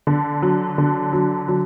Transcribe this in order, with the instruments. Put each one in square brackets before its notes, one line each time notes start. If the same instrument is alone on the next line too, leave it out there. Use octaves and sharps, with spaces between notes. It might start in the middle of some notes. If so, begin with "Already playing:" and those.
[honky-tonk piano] D3
F#3
D3
F#3
F#3